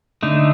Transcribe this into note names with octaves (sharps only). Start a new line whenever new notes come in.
D3 A3 D#4